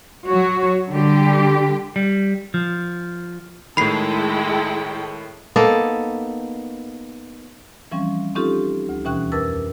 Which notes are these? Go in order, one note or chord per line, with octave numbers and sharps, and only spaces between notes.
F#3 F#4 C#5
D3 G3 G4
G3
F3
A2 D#3 G#3 E4 A4 G5 B5 C7
A#3 B3 D#4 A4
E3 F3 G3 C4 C#4
C4 C#4 D#4 F4 G4 A4
D2
D#2 B2 E3 C#4 G5 F#6
F2 A#4 B4 D6 E6 A6